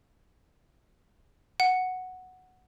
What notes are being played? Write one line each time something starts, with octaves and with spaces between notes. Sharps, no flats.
F#5